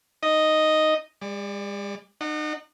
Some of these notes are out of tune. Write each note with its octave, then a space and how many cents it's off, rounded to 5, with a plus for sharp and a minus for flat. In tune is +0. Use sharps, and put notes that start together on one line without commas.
D#4 +0 D#5 +0
G#3 -45 D5 +5
D#4 -35 F#5 +0